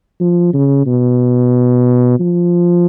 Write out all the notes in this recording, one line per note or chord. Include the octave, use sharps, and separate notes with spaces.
F3
C#3
B2
F3